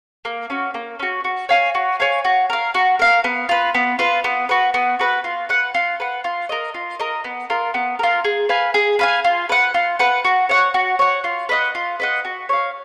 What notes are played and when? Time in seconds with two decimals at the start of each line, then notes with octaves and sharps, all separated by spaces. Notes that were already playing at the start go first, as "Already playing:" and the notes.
0.25 A#3
0.50 C#4 F#4
0.74 A#3
1.00 C#4 F#4
1.24 F#4
1.49 C#5 F5 G#5
1.75 F#4
2.00 C#5 F5 G#5
2.25 F#4
2.50 A#4 F5
2.74 F#4
2.99 A#4 F5
3.24 B3
3.49 F4 B4
3.74 B3
3.99 F4 B4
4.24 B3
4.49 F#4 B4
4.74 B3
4.99 F#4 B4
5.24 F4
5.49 B4 F#5
5.74 F4
6.00 B4 F#5
6.24 F4
6.49 A#4 D#5
6.74 F4
7.00 A#4 D#5
7.24 B3
7.50 F4 A#4
7.74 B3
7.99 F4 A#4
8.24 G#4
8.49 B4 F5 G#5
8.74 G#4
8.99 B4 F5 G#5
9.25 F4
9.49 B4 F#5
9.74 F4
9.99 B4 F#5
10.24 F#4
10.49 C#5 F#5
10.74 F#4
10.99 C#5 F#5
11.24 F4
11.49 B4 D#5 F#5
11.75 F4
12.00 B4 D#5 F#5
12.25 F#4
12.49 C#5 F5